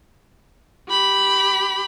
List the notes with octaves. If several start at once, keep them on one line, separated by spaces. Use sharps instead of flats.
G4 B5